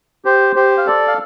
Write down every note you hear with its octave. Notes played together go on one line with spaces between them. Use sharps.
G4 C5
G4 C5
F5
A4 D5
F5